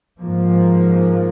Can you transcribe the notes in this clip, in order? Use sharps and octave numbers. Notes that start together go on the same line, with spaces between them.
G#2 F3 A#3